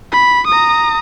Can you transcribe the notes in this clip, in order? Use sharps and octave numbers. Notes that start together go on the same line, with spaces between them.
B5
A#5 D#6